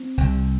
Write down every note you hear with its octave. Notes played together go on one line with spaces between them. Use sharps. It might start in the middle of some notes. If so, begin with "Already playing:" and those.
Already playing: C4
C2 C3